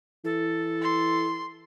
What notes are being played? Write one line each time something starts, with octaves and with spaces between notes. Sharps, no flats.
E3 A4
C6